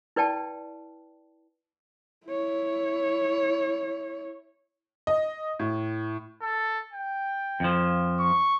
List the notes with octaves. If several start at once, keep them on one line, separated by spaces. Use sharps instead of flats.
E4 B4 D5 G5 A5
E4 C#5
D#5
A2
A4
G5
F2 F3
C#6